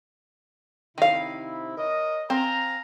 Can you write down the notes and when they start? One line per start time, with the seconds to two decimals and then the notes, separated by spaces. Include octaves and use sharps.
0.98 C3 D#3 E4 F5
1.77 A#4 C#5 D#5
2.30 C4 F5 G#5 A#5